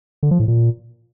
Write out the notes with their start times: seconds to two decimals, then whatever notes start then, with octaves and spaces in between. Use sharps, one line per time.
0.23 D3
0.31 F3
0.39 A2
0.48 A#2